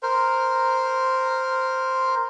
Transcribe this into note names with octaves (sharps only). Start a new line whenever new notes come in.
A#4 C5